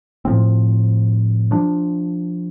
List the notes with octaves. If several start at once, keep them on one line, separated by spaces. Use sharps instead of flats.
A2 F3 C4
F3 D4